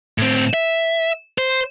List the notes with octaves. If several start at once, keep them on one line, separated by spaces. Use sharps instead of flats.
A2 C4
E5
C5